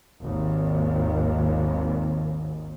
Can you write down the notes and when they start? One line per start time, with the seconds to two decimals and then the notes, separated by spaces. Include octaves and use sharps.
0.22 G#1 D#2